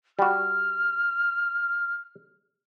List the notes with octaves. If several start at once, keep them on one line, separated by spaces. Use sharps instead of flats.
G3 F#4 F6